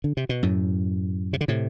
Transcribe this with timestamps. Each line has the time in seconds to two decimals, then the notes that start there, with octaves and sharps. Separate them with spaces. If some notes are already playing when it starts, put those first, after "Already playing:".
0.04 D3
0.17 C3
0.29 B2
0.43 F#2 A2
1.33 C3
1.41 D3
1.48 A2 C3